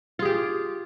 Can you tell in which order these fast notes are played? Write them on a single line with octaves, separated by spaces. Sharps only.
F4 G#4 G4